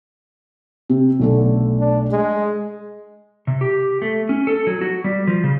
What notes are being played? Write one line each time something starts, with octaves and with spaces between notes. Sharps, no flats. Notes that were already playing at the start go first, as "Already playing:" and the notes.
C3
B1 D3 A3 A4
D4
G#3
C3
G4
A3
C#4
A4
F#3
F#4
G3
F3
C#3